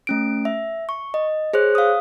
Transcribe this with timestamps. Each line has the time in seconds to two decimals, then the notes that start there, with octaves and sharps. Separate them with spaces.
0.07 A3 C#4 D7
0.45 E5
0.89 C#6
1.14 D#5
1.53 G#4 C5 C#5 F#6
1.75 F5 D#6